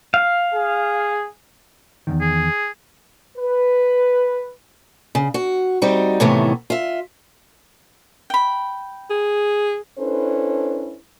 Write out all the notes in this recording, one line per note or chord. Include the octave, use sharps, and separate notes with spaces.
F5
G#4
E2 G#2 D#3
G#4
B4
C#3
F#4
G3 C4 D#4 F#4
A2 C3 D#3 E3 A3 B3
F4 E5
G5 B5
G#4
C#4 D4 E4 A4 B4 C5